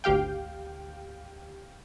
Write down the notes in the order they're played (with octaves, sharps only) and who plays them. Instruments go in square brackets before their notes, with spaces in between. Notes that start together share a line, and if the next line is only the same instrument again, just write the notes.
[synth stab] G#1 D2 G4 F5 G5